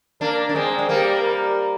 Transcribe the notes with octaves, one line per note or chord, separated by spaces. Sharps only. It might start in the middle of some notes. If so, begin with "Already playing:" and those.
A#3 D4 A#4
D4
G#3 C4 G#4
G#3
G3 A#3 A#4
A#4